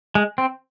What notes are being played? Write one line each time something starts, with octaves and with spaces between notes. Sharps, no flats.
G#3
C4